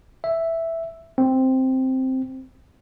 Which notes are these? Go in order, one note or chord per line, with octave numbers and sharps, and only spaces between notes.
E5
C4